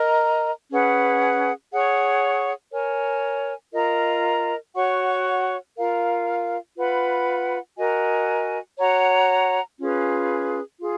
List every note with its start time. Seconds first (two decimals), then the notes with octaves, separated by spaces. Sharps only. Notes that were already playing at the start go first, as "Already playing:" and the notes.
Already playing: A#4 D#5 A#5
0.70 C#4 G#4 B4 F#5
1.72 G#4 C#5 F#5 C#6
2.72 A#4 C#5 G#5
3.73 F4 A#4 D#5 A#5
4.75 F#4 C#5 F#5 C#6
5.76 F4 A#4 F5
6.77 F4 B4 F#5 B5
7.78 F#4 A#4 D#5 G#5
8.78 F#4 C#5 F#5 A#5
9.79 C#4 F4 G#4 B4
10.80 F4 G#4